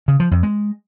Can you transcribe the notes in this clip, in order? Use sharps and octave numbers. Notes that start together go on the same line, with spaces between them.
C#3
F3
F2
G#3